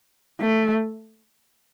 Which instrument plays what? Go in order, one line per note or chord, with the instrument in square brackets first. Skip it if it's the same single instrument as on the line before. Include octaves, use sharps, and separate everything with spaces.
[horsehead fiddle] A3